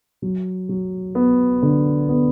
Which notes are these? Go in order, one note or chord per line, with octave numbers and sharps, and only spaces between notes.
F#3
F#3
B3
D3
B3